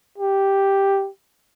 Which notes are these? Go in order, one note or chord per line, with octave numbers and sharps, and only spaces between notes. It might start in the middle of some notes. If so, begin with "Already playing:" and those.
G4